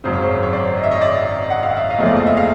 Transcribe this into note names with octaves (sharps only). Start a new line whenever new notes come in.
G#1 F#2 C#3 C5
C#5
C5
C#5
C5 D5
D#5
E5
C#5 D#5
D5 E5
F#5
F5
E5
D#5 F5
F#1 E2 C#3 F3 A3
D5
D#5
E5
F5